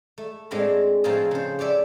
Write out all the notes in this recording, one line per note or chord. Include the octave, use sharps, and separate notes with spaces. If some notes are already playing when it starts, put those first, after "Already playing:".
A3
A2 G#3 C4 D4 F4 B5
A2 F3 C4 D#4 F4 G#4
C#3 C5
G4 C#5 D5 E5